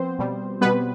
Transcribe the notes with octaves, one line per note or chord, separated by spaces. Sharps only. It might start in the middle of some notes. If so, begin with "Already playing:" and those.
Already playing: F3 B3 C4 C5
B2 G3
B2 G3 B3 B4